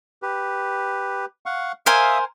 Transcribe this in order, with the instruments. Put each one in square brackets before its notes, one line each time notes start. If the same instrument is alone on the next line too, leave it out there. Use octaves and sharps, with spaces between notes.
[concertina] G4 B4
F5 F#5 C#6
[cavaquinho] A#4 C5 G#5 [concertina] E5 F5 D#6